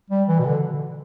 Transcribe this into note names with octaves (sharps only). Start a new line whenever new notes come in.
G3
E3
B2
D3